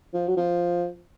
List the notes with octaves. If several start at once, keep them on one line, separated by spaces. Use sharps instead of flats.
F3
F#3
F3